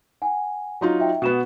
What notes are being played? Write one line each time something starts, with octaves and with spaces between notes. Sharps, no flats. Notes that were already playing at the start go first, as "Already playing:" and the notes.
F#5 G#5
F#3 D#4 F4
E5 G5
B2 B3 F#5 E7